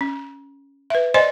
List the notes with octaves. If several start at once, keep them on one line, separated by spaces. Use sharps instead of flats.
C#4
B4 E5
C5 D5 D#5 G#5 C6